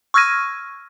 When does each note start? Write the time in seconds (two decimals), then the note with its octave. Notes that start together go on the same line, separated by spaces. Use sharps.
0.14 C#6 E6 F6 G#6 A#6 D#7